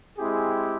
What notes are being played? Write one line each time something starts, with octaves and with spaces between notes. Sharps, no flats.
G#3 C4 E4 G4 G#4